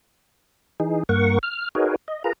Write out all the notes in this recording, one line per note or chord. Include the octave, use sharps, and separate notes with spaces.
E3 D#4 G#4
G2 A#3 A#4 F#5 C#6
F6
D#4 F#4 G#4 A#4 B4 C#5
D#5
F4 G#4 A#4 B4 A#5